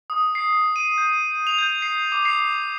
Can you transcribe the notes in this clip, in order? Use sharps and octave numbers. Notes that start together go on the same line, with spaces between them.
D#6
C7
D#7
G6
F7
G6
C7
D6
C7